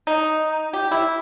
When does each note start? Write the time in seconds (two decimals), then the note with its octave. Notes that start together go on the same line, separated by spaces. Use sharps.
0.07 D#4
0.73 G4
0.91 E4